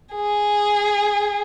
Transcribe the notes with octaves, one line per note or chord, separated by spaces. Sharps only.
G#4